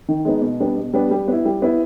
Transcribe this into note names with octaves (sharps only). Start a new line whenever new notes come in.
D#3
G#3 B3 D#4
B2
G3 B3 D4
B2
G3 B3 D4
G3
B3 E4
G3
B3 E4